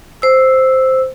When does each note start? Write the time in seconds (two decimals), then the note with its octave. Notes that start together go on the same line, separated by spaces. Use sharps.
0.22 C5 E6